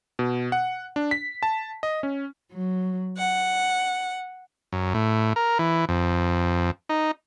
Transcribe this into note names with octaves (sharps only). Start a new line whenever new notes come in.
B2
F#5
D4
B6
A5
D#5
C#4
F#3
F#5
F#2
A2
A#4
E3
F2
D#4